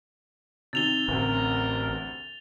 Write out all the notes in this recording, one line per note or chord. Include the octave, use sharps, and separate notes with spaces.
C3 D#3 A6 F7 G7
A1 D2 C3 A#4